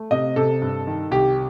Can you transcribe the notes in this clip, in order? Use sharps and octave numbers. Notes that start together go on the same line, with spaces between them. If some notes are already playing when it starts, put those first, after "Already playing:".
Already playing: A3
C3 D#5
C3 A4
G2
D#3
C2 G4